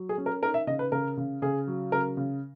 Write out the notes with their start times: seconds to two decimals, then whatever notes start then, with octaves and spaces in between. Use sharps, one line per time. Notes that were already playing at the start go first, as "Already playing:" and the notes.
Already playing: F#3
0.09 G#4
0.18 C#4
0.26 A#4
0.42 D#4 A#4
0.54 E5
0.67 C#3 D#5
0.79 B4
0.92 C#3 A#4
1.17 C#3
1.42 C#3 G#4
1.67 F#3
1.92 C#3 A#4
2.17 C#3